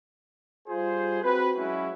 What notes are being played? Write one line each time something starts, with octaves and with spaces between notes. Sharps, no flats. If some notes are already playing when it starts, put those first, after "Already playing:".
G3 F4 G#4 C5
C4 F#4 B4
F#3 G#3 C#4 E4 F#4